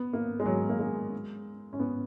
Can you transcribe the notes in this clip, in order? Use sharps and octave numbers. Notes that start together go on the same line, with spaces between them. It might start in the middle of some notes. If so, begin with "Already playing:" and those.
Already playing: B3
A#3
G#3
F#3
A#3
G#3
C#4
B3